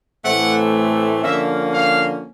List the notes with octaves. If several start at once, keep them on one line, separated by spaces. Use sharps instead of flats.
A2 E3 A3 C4 F#5
D3 F3 A#3 C#4 E5
F5